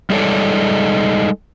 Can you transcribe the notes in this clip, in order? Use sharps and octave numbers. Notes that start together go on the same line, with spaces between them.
G3 G#3 D#4 A4 C#5 D5